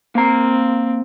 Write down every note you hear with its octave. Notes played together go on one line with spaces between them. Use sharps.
A#3 C4 A#5